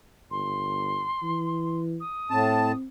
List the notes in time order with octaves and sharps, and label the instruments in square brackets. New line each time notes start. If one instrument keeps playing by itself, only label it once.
[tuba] G1 [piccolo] C6
[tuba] E3
[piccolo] D#6
[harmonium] A2 A5 [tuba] C4